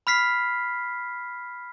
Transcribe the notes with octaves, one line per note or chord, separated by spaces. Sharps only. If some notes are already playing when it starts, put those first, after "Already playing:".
B5 F6 B6 C7